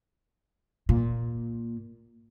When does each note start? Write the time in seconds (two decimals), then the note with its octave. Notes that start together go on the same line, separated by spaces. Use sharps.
0.89 A#2